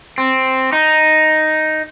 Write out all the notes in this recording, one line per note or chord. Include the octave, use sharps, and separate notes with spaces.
C4
D#4